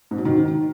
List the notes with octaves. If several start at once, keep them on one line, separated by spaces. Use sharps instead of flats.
G#2
F#3
D#3